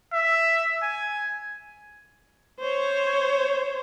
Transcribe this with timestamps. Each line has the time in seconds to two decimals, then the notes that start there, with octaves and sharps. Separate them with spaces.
0.12 E5
0.83 G#5
2.59 C5 C#5